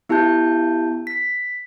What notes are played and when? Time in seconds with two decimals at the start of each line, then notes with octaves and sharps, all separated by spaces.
0.09 B3 E4 G4 A5 G6
1.07 B6